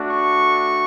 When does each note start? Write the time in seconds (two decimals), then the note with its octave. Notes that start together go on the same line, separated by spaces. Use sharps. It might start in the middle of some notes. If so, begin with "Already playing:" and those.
Already playing: A3 D4 F#4
0.11 C#6